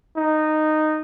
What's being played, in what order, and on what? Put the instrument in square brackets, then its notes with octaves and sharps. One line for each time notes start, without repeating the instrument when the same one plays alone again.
[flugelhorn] D#4